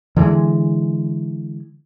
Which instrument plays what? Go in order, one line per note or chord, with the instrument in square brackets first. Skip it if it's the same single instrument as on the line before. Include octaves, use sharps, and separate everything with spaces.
[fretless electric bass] D3 E3 G3 G#3